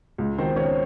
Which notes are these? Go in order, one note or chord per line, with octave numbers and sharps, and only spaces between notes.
C#2
D#3 C4 C5
D#3 C#4 C#5